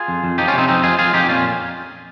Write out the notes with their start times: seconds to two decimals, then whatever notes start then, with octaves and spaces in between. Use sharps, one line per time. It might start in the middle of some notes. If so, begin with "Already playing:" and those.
Already playing: F4 G#4
0.08 F2
0.24 F2
0.38 F3 D#4 G4
0.48 C#4 F4
0.54 C3 C4 D#4
0.68 F2 C4 D#4
0.83 F2 F4 G#4
0.98 F2 F4 G#4
1.13 F2 D#4 G4
1.29 A#2 C#4 F4